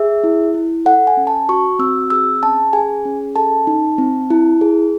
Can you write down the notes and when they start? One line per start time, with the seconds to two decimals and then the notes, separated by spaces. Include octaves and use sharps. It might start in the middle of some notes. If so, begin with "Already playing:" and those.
Already playing: G#4 E5
0.24 E4
0.54 E4
0.86 A4 F#5
1.07 G#5
1.17 C#4
1.27 A5
1.49 F#4 C#6
1.79 C4 E6
2.10 G#4 E6
2.43 C#4 A5
2.73 G#4 G#5
3.05 C#4
3.36 A4 A5
3.67 D#4
3.98 C4
4.30 E4
4.61 G#4